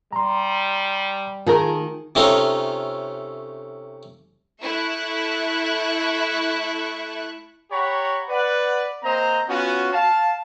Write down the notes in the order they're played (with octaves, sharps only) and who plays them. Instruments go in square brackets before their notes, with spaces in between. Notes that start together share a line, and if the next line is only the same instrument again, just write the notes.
[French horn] G3 [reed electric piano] A#5 C6
[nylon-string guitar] D#3 [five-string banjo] A3 G#4 A#4 [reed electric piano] F4
[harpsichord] C3 A3 C#4 D#4 F4 A4
[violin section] A3 E4 E5 C#6 F#6
[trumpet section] G4 C#5 F#5 A#5 B5 C#6
B4 D5 F#5
A#3 C4 C5 D#5 A#5
B3 C#4 F4 F#4
F5 A5